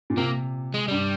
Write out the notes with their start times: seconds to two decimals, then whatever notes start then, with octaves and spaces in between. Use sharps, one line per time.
0.10 A#2
0.17 C3 A#3
0.74 G#3
0.88 G2 G3